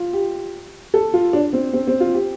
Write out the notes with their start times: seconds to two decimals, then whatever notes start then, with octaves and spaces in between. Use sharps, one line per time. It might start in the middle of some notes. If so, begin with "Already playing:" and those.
Already playing: F4
0.13 G4
0.94 A4
1.14 F4
1.33 D4
1.53 C4
1.73 C4
1.88 C4
2.00 F4
2.14 G4